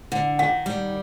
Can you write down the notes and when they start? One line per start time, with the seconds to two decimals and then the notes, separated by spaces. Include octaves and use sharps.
0.12 D3
0.39 D#3 F#5
0.66 G3